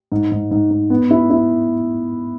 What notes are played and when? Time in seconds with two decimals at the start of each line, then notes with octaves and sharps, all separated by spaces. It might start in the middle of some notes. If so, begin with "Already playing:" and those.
0.12 G#2
0.32 G#2
0.51 G#2
0.71 G#2
0.90 B3
1.11 E4
1.30 E4